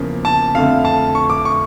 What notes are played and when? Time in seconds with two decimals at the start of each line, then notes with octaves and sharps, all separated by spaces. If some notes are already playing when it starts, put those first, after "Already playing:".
Already playing: E2 C#3 F3 A#3
0.25 A5
0.55 F2 D3 A3 F5
0.85 A5
1.15 C#6
1.30 D6
1.45 C#6